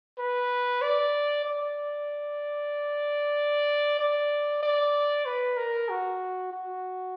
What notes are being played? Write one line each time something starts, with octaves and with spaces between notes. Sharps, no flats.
B4
D5
D5
D5
D5
B4
A#4
F#4
F#4